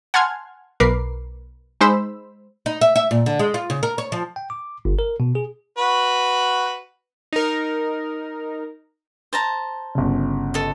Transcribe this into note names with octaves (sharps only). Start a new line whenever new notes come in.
F#5 G#5 A5 C6 F6 G#6
B1 A#4 B4 D6 C7
G#3 D#4 C5 B5 E6
D#4
E5
E5
A#2
D3
G#3
F4
C#3
A#4
C#5
F3
G5
D6
G1
A#4
B2
G#4
F#4 B4
D#4 A#4
C5 A5 A#5
G1 C#3
A4 D#5